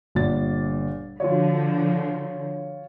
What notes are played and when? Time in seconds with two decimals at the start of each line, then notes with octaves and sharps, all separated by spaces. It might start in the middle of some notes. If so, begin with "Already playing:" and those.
0.15 G1 A#2 A6
1.20 D3 F3 F4 F#4 C#5